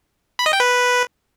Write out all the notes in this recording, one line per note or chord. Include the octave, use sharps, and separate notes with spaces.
B5
D#5
G5
B4